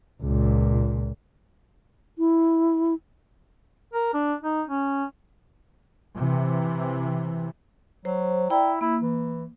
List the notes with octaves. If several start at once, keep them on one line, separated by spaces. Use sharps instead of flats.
C#2 A#2
E4
A#4
D4
D#4
C#4
C3 E3
F#3 C5
E4 D5 G5 A#5
A#3 E4
E3